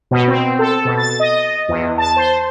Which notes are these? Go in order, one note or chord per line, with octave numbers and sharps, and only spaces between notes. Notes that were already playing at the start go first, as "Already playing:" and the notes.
B2
C4
A4
B2
A6
D#5
E2
A5
C5